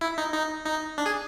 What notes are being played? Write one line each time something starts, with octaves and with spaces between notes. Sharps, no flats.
E4
D#4
D#4
D#4
D4
G#4